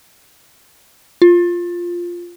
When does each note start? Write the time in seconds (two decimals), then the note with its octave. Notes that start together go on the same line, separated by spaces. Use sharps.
1.22 F4